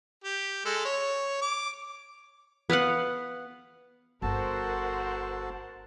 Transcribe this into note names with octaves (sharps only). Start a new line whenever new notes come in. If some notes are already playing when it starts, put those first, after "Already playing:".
G4
G#3 A4
C#5
D6
B3 B4 F5 F#5
G1 F#4 A4 A#4 C5 F#5 A5